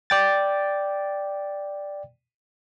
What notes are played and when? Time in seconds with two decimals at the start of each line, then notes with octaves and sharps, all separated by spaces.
0.10 D5 G5 A6